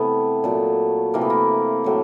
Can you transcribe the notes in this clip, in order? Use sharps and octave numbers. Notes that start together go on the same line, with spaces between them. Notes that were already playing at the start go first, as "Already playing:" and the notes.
Already playing: C3 E3 A3 B3
A#2 F#3 A3
C3 E3 A3 A#3
B3
A#3
A2 F#3 A3